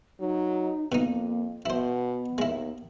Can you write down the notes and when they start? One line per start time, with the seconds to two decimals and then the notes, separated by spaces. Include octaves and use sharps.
0.20 F#3 D#4
0.92 F2 B2 A#3 D#4
1.66 B2 B3 E4 C5
2.38 D#2 G#3 E4